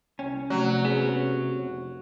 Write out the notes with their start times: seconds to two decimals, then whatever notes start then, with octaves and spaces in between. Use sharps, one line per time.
0.19 C2 C#4 G5
0.50 C3 F3 F#3 A3 A#5
0.85 B3 C#4 G#4
1.60 F1